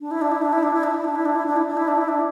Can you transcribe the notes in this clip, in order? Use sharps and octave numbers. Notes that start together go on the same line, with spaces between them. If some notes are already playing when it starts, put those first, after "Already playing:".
D4
E4
D4
E4
D4
E4
D4
E4
D4
E4
D4
E4
D4
E4
D4
E4
D4
E4
D4
E4
D4